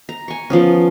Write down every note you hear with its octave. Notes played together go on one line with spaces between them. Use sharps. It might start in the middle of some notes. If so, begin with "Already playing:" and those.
A#5
G#5 C#6
F3 B3 C#4